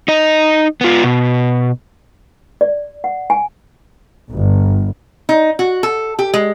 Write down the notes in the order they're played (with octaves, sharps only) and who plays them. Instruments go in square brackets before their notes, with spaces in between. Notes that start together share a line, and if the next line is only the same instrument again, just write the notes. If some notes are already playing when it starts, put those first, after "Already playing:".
[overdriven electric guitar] D#4 D#5
B3 F4
B2
[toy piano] D5
F#5
G#5
[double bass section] G1
[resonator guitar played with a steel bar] D#4
F#4
A4
G4
G#3